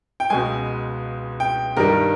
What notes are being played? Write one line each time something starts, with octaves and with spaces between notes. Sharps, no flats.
G5
C#2 B2 G#3 G#5
G5
G2 D#3 G3 A#4